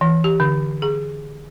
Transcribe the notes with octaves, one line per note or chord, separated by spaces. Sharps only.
E3
G4
D3
G#4